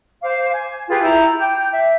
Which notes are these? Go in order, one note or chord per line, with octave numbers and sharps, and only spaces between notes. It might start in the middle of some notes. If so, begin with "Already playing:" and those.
C5 F5 D6
G#5
F4 G4 G#4 B4
E4 A#5 G6
G5 D6 G6
E5